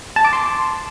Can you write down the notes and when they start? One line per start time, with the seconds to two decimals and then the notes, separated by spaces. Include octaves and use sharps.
0.16 A5
0.25 D6
0.33 C6